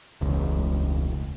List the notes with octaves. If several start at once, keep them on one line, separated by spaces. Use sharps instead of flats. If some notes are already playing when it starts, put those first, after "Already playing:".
E1 C#2